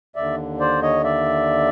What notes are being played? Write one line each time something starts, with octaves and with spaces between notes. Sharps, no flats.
D#2 D3 D5 E5
C5 D5
C#5 D#5
D5 E5